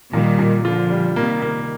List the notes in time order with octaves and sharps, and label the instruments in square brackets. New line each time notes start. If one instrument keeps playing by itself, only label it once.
[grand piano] A#2 [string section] D#3 G3
[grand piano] A#2
[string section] D3 F3 [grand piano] F4
[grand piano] G3
[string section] C3 D#3 [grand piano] A#3
[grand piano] A#3